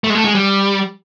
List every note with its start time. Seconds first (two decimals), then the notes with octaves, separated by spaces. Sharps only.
0.04 A3
0.10 G#3
0.15 A3
0.25 G#3
0.35 G3